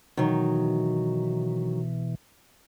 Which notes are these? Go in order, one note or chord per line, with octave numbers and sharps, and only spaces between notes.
B2 D#3 E3 F#3